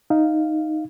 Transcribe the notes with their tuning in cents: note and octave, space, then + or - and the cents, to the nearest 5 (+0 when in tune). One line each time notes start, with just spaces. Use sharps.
D#4 +0 F5 +0